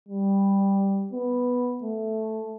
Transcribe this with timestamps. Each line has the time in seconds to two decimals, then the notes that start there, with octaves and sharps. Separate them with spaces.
0.08 G3
1.13 B3
1.83 A3